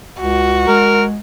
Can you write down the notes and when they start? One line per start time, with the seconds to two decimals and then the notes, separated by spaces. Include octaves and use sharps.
0.20 C#2 F#4
0.68 G#3 A#4